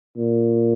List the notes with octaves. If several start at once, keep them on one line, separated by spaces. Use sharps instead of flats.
A#2